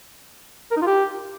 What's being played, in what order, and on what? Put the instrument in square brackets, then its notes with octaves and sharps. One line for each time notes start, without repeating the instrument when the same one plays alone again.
[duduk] A#4
D#4
F4
G4